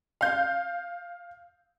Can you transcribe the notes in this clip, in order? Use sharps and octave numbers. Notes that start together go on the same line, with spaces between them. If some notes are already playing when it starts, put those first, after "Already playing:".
F5 G6